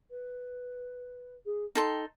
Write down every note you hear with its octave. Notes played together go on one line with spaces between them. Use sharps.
B4
G#4
D#4 A4 G5 C6